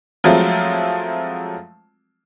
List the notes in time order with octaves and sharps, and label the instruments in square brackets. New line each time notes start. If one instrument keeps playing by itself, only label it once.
[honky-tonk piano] F3 F#3 G#3 A3 C4 F4